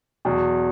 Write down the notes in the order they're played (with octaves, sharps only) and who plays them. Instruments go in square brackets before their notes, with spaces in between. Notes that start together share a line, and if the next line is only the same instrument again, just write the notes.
[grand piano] E2 B2 F#3